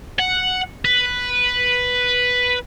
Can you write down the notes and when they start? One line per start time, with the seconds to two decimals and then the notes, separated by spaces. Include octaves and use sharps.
0.19 F#5
0.85 B4